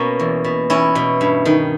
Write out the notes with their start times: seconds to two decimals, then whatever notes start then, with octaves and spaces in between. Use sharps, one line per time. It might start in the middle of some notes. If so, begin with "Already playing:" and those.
Already playing: B2 A#3 C#4
0.20 E2
0.44 B2
0.70 E2 C#4 E4
0.95 B2
1.21 G2
1.45 D#3